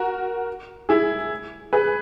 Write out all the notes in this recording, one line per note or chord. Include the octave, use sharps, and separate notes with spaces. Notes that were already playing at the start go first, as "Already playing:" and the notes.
Already playing: F#4 A#4
E4 G#4
G#4 B4